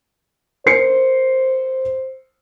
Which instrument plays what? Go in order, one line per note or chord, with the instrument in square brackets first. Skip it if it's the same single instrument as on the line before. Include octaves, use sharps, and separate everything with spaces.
[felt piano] A#4 C7 C#7 [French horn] C5